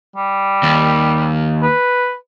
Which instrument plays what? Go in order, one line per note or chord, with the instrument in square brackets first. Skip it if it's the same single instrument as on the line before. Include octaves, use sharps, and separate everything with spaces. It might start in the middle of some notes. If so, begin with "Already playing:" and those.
[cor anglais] G3
[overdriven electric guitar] D#2
[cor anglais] B4